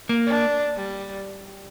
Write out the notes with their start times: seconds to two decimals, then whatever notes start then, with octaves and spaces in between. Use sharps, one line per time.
0.09 A#3
0.26 D4
0.77 G3